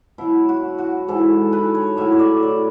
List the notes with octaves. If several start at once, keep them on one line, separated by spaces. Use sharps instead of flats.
B2 F#3 E4
F#4
F#4
G#2 E3 A4
B4
C#5
A2 F#3 E5
C#5
D5
D5